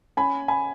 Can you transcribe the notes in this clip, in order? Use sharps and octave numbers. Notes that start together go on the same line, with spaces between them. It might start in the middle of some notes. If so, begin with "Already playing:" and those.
C#4 G#5 B5
G#5 B5